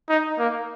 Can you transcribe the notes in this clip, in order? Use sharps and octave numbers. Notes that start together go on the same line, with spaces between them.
D#4
A#3